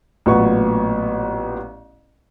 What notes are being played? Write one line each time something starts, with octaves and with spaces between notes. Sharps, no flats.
A1 A#2 F#3 B3 C#6